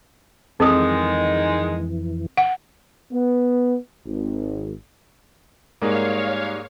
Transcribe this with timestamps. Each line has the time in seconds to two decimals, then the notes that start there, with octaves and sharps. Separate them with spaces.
0.60 F2 D#3 E3 G#3 C4 A4 A#4 D#6
2.37 F#5
3.12 B3
4.06 G#1
5.82 G#2 G3 A#3 D#4 G#4 A#4 C#5 F5